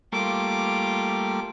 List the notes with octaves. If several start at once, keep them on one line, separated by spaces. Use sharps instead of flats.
G3 A3 A#3 F4 D6